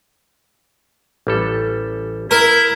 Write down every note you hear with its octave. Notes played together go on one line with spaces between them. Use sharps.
A1 G3 A4
E4 A#4